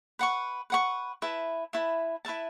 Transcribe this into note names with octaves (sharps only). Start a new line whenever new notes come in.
B4 F#5 C#6
B4 F#5 C#6
E4 B4 E5 A5
E4 B4 E5 A5
E4 B4 E5 A5